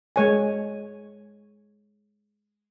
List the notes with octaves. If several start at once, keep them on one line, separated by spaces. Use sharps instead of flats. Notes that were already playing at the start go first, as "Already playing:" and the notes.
G#3 C#5 G#5